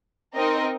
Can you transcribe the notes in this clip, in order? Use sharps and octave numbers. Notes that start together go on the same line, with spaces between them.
C4 D#4 A#4 D#5